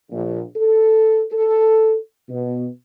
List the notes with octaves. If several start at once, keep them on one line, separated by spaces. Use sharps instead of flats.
A#1
A4
A4
B2